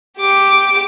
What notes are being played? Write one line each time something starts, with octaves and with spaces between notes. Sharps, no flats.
G4 D6